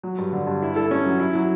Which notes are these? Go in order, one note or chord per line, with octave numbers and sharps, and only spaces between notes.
F#3
G2
D3
G2
E4
A4
C#4
F#3
E4
F#3